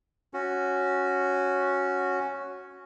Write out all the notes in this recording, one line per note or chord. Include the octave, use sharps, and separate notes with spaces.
C#4 F#4